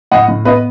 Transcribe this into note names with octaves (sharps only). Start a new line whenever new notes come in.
A2 D#5 F#5
A2
B3 B4 D#5